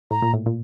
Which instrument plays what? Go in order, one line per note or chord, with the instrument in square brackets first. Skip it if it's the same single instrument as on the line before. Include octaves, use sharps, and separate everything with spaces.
[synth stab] A2 [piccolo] A#5
[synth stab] A#2
A2
A#2